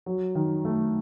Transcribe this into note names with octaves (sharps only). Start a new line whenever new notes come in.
F#3
D#3
A3